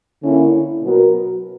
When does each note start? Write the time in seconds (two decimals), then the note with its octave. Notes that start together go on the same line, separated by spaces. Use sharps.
0.22 D3 A#3 C#4 E4
0.82 B2 F#3 B3 F#4 A#4